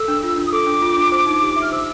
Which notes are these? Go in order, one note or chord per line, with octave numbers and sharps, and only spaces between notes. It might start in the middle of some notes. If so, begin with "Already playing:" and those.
Already playing: A4 E6
D4
F4
D4
D#6
A4 D6
D4
F4
D4
C5
D#4
G4
E5
F6
C5 E6